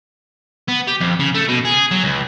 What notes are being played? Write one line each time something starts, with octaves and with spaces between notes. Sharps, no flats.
B3
G4
F2
C#3
A3
B2
G#4
F#3
C#2